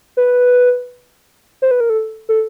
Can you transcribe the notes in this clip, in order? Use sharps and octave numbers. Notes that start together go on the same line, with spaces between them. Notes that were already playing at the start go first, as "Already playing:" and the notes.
B4
C5
B4
A#4
A4
A4